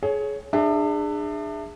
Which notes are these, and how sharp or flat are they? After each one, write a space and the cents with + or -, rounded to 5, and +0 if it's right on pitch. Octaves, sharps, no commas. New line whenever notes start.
G#4 +30 C#5 +5
D4 +30 G#4 -15 E5 +0